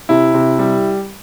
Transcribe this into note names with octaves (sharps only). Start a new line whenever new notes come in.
C3 E4
C3
G3